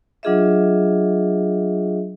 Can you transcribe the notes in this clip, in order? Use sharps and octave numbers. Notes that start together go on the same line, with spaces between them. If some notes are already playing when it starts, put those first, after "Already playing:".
F#3 D4 F4 G#4 D#5 E5